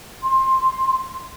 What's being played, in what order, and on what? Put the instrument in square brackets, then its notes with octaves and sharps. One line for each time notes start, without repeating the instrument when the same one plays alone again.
[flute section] C6